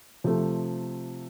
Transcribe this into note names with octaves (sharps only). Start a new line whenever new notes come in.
C3 F3 A3